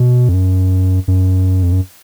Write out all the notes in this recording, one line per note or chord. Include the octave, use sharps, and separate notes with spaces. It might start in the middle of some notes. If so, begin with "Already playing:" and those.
Already playing: B2
F2
F#2
F#2
F2
F#2